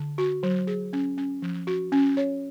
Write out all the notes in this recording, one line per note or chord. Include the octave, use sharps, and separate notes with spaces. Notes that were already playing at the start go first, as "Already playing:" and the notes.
Already playing: D3
F#4
F#3
G#4
C#4
C#4
F3
F#4
C#4
C#5